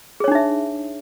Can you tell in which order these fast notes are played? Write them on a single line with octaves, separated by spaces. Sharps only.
G#4 C#5 D4 D#4 E5